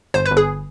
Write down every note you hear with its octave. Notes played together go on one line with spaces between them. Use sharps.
G1 C5
B4
G1
G#4